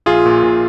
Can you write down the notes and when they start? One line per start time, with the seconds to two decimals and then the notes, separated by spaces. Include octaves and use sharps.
0.06 A#1 F4 G#4
0.26 A#2
0.43 A#2